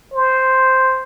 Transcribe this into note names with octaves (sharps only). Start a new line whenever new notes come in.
C5